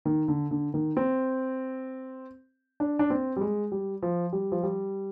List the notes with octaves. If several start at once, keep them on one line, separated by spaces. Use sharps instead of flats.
D#3
D3
D3
D#3
C4
D4
D4
C4
G3
G#3
G3
F3
G3
F3
G3